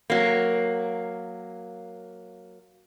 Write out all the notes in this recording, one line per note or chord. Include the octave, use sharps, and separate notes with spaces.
F#3 A#3